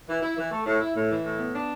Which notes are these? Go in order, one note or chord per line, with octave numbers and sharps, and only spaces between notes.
E3
E4
E3
A3
A2
E4
A2
E3
A2
B3
D4